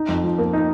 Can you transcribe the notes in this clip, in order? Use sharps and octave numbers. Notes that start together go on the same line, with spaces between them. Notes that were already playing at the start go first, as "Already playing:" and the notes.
Already playing: D#4
F2
F3
A#3
D#4